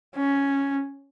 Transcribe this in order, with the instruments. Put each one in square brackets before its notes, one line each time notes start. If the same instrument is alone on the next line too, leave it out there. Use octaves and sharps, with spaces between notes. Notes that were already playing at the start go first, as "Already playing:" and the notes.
[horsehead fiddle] C#4